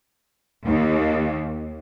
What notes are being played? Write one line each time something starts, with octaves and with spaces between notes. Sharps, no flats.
D#2